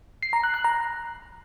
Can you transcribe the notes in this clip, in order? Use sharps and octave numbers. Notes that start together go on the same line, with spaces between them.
C7
A#5
F#6
F#6
A#5